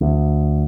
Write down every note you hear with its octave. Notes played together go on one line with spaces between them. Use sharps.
D2